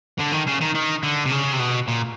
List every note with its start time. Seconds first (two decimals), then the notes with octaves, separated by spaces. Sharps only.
0.20 D3
0.33 D#3
0.47 C#3
0.61 D#3
0.75 D#3
1.03 D3
1.26 C3
1.32 C#3
1.53 C3
1.59 B2
1.88 A#2